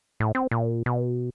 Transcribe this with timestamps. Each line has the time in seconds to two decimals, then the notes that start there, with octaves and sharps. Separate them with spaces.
0.20 A2
0.35 C4
0.51 A#2
0.86 B2